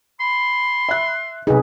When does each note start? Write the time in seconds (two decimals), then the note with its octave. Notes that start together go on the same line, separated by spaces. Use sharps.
0.20 B5 C6
0.89 E5 F#6
1.47 B1 C3 D#4 G#4 B4